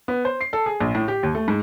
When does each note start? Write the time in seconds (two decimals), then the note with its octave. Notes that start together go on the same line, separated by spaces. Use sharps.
0.08 B3
0.25 C5
0.41 C7
0.53 A4
0.66 G#4
0.80 A#1
0.95 A2
1.08 G4
1.23 D#2
1.35 A3
1.48 G#2